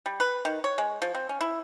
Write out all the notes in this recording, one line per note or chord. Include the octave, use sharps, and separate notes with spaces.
G3
B4
D#3
C#5
G#3
F3
C4
C#4
E4